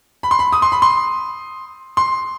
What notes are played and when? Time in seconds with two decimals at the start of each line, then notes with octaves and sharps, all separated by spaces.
0.23 B5
0.31 C6
0.39 B5
0.52 D#6
0.62 C6
0.72 B5
0.82 C6
1.97 C6